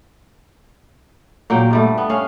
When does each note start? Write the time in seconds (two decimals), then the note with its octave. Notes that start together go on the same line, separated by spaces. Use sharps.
1.50 A#2 F#3 A#3 G5
1.71 G2 G3 A3
1.98 B3
2.10 C#4 F5